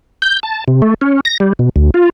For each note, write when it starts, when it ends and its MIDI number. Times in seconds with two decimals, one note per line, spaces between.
0.22 0.40 91
0.43 0.64 81
0.68 0.82 48
0.82 0.94 57
1.01 1.20 61
1.25 1.38 94
1.40 1.53 55
1.59 1.69 47
1.76 1.90 38
1.94 2.09 65